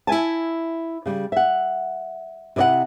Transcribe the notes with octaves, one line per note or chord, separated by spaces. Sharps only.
E4 E5 G#5 A5
C#3 G3
E5 F#5
C3 E4 D5 D#5 F#5